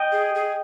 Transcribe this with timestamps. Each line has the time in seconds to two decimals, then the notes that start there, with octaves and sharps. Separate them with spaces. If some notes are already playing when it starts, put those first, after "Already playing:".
Already playing: D#5 G5
0.12 G#4
0.35 G#4